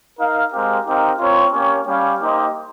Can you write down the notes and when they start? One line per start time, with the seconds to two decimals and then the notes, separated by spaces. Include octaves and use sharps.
0.18 D#4 A#4 F5
0.52 G#3 C4 G4 A#4 F5
0.86 C4 D#4 G4 A#4 F5
1.19 C4 F4 A#4 C#5
1.53 A#3 C#4 G4 C#5
1.87 G3 C#4 G4 C#5 F5
2.21 A#3 D#4 G4 C5 D#5